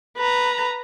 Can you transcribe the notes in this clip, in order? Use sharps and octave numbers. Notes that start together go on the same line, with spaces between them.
B4 A#5